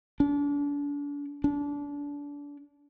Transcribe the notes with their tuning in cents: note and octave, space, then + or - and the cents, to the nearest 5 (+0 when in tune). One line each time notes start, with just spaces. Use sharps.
D4 -35
D4 -30